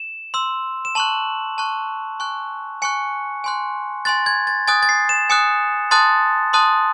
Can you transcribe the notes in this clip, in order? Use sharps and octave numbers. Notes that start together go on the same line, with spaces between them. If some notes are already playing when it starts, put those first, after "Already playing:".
Already playing: E7
C6 E6
E7
A5 C#6 F#6 F#7
A5 C#6 F#6
G#5 C#6 F#6
G#5 C#6 F#6 C#7
G#5 C6 F#6
G#5 C6 F#6 A6
G#6
A6
G#5 D#6 F#6 A6
A6
C7
E7
G#5 D#6 F#6 C#7
A5 C6 D#6 F#6 A6
A5 C6 D#6 F#6